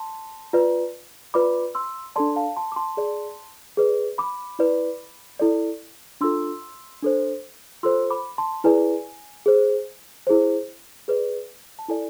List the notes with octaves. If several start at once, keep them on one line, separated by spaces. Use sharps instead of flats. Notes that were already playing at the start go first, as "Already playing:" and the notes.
Already playing: A5 C6
F4 B4 D5
F4 B4 D5 B5 D6
C6 E6
D4 A4 D5 A5 C6
F5 A5
A5 C6
D6
A5 C6
G#4 D5
G#4 B4 D5
B5 D6
E4 B4 D5
E4 A4 D5
D4 F4 A4 C6 E6
D4 A4 C5
F4 A4 C5 C6 E6
B5 D6
A5 C6
E4 G#4 B4 D5 G#5
G#4 C5
E4 G#4 C5
G#4 B4 D5
A5
E4 A4 D5 G#5